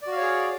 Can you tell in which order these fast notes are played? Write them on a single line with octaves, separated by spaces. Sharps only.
D5 F#4 F5 C#5 G#4